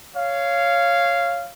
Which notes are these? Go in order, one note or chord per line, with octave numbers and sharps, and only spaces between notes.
C#5 F5